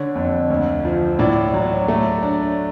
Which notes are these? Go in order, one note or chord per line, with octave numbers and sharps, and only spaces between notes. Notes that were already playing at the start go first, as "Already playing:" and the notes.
Already playing: D3 C#5
F2
D2
F3
A2 D5
F#3
A3
D4